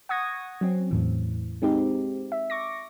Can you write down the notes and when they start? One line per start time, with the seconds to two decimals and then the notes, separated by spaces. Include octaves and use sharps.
0.09 F#5 C#6 D#6 G#6 A#6
0.61 F#3 C4 C#4
0.91 E2 A2 E3
1.62 G#3 C4 D#4 G4
2.32 E5
2.50 C#6 D6 A#6